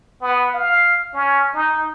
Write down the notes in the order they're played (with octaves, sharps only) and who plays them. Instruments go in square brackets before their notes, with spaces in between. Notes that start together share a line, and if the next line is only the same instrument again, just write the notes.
[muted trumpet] B3
F5
C#4
D#4